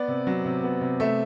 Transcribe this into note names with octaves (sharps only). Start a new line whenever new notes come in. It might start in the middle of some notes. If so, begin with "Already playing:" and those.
Already playing: B3 D5
C3
F#3
C3
B3
C3
A3 E5